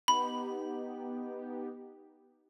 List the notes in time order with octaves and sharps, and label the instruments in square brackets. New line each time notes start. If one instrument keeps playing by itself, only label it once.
[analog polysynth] B3 D#4 G4 [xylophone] B5